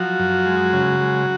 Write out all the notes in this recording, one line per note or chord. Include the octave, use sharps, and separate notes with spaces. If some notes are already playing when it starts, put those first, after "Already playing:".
Already playing: F3 F#3 F#4
F#2
G#3
C#3
G#3